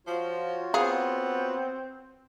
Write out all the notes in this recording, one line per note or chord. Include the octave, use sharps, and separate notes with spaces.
F3 F4 F#4 C#5
B3 C4 G#4 F5